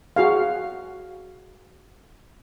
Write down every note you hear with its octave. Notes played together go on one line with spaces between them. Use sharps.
F#4 G#4 F5